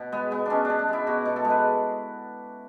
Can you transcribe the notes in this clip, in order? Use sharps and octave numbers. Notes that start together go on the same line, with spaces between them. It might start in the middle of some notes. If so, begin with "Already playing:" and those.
Already playing: B2
G#3 B3
G#3 B3
G#3 C#4 D4
B2 D4
D4
G#3 E4
B2 F#4
B2
A4
G#3
B4